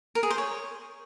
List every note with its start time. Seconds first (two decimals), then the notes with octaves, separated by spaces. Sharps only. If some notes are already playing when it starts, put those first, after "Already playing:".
0.15 A#4
0.23 G#4
0.30 C5
0.38 C#5